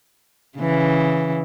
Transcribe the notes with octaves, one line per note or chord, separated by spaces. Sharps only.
C#3 E3